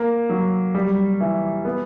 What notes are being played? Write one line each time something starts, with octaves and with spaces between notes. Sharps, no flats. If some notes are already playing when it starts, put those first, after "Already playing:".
Already playing: A#3
F#3
G3
E3
B3